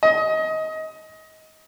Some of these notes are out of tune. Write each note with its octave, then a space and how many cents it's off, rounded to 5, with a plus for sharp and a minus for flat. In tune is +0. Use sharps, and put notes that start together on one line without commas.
D#5 +25